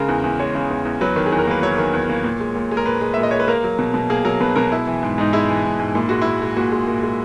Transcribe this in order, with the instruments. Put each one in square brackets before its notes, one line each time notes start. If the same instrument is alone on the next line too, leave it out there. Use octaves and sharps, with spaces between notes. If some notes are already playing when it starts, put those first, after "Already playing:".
Already playing: [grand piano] C#3 G#3 A#4
E2
E2
G#3 C#5
C#3
E2
E2
F#3 B4
D#3
G#4
E2
A#4
A#3 B4
F#3 C#5
D#3
E2
A#3
A#2
G#3
A#2
G#3
A#4
A#2 B4
G#3
E5
A#2
D#5
G#3 C#5
B4
A#3 A#4
F#3
B2
B2
A#3 G#4
F#3 A#4
B2 B4
B2 A#4
G#3 E4
E3
G#2
G#2 D#4
G#3 E4
E3
G#2
G#2
A#2 E4
G#3 F#4
A#2 E4
G#3
A#2 F#4
G#3
A#2
G#3